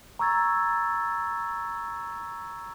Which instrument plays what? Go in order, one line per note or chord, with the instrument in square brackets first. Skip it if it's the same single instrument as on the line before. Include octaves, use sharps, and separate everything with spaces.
[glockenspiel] A#5 C#6 E6 G#6 A6